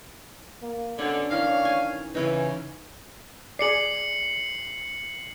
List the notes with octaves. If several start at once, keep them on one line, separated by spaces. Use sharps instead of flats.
A#3
B2 D3 C#4 D4
D#3 E3 C#4 C#5 F5
G#5
C#3 E3 C#4 D#4 B4
G#4 D5 C7 C#7 F#7